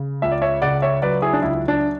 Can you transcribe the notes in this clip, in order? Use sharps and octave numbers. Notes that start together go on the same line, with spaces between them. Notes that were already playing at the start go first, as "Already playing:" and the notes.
Already playing: C#3
C#2 E5
D5
C#5 E5
C#3 D5 F#5
C#5 E5
F#3 B4 D5
E4 G#4
D4
C#2 E4
D4